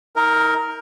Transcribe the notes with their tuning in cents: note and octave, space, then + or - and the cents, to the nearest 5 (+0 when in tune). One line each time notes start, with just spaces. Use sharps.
D#4 +40 A#4 +0